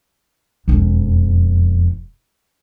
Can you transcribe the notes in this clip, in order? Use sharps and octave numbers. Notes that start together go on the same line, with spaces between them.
E1 F2